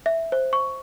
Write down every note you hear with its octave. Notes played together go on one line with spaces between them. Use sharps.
E5
C5
C#6